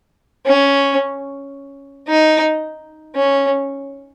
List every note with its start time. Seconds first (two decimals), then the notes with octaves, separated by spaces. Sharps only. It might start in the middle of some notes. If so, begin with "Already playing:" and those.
0.46 C#4
2.08 D#4
3.15 C#4